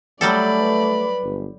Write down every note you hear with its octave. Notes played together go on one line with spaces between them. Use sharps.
F#3 G3 A3 A4 D5 B5
B4
G1